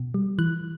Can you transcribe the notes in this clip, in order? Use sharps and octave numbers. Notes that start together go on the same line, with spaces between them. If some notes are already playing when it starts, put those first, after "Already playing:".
Already playing: B2
G3
E3 F#6